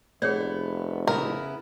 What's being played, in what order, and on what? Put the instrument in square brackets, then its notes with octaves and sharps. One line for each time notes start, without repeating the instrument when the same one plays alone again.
[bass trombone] F1 [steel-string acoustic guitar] B3 [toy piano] G#4 C#5 D5
[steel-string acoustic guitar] C#3 B3 E4 [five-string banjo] A#4